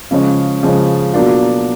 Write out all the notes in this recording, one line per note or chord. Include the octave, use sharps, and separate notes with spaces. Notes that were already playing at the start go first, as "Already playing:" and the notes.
C#3 F3 G#3 C#4
C#3 F3 G#3 C#4
B2 F#3 A#3 D4 F4